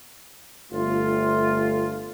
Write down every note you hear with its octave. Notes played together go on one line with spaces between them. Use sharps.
G1 A3 F4